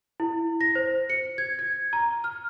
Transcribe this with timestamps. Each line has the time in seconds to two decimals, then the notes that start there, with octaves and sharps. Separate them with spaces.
0.20 E4
0.61 A#6
0.75 C5
1.10 C#7
1.38 G#6
1.59 G#6
1.93 A#5
2.24 F6